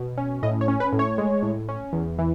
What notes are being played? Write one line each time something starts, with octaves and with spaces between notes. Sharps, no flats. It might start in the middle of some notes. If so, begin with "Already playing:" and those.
Already playing: B2
C#4
A2 D#5
C#5
C#4
B4
A2
C#5
G#3
A2
C#4
E2
E3